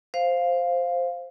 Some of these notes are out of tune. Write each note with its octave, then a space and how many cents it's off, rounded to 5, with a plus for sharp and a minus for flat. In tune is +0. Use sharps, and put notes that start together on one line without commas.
C5 +0 F5 +0